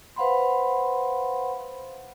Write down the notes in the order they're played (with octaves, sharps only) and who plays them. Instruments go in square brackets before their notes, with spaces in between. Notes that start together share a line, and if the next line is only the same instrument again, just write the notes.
[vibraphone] B4 C5 F5 F#5 B5 C6